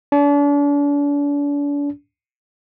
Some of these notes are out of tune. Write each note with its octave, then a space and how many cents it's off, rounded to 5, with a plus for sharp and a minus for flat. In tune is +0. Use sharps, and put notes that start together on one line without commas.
D4 -40